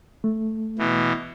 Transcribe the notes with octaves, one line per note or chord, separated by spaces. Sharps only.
A3
B2 E3